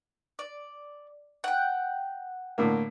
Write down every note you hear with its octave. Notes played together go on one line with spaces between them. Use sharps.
D5
F#5 G5
A2 D3 A#3